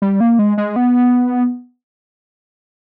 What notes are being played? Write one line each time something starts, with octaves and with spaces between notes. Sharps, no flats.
G3
A#3
G#3
G#3
B3